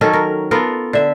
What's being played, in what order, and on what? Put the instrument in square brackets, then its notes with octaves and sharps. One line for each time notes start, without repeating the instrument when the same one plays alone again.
[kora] D#3 F#3 C#4 A4
A#4
B3 F4 A4 A#4
D3 E5